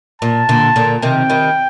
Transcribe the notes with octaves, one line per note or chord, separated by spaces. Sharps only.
A#2 A5
A#2 D3
A#2 D3
C3 D#3 G5
D#3 G3